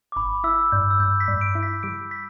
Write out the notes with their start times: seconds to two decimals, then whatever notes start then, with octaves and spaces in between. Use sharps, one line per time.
0.12 D6
0.16 G1 B5
0.44 E4 E6
0.72 G2 G6
0.91 E6
1.00 G2 G6
1.20 B6
1.28 G2
1.41 D7
1.55 E4
1.63 B6
1.83 G3 D7
2.11 B6